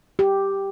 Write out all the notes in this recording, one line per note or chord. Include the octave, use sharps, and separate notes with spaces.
G4